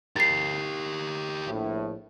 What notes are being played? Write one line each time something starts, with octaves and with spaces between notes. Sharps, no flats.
G4 A#4 A6 C7
A#1 A2